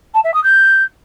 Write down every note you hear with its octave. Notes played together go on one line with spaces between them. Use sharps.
A5
E5
D#6
G6